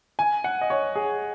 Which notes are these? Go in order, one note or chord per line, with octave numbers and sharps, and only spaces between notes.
G#5
F#5
D#5
C#5
G#4